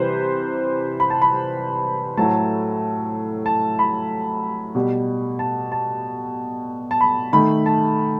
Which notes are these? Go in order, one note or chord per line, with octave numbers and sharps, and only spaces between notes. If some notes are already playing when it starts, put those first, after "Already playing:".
Already playing: C3 E3 G3 B4 C5
B5
A5
B5
A2 F#3 A3 A5
A5
B5
B2 G3
A5
A5
A5
B5
D#3 A3 B5
A5